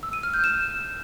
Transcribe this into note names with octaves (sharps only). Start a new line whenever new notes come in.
E6
D#7
F6
G6
E7